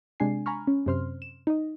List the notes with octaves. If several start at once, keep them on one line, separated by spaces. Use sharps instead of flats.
C3 G#3 D4 G#5 C7
G#5 A#5 B5 C#6 F6
C#4
F#2 C3 C5 C6 F6
E7
D#4 D#5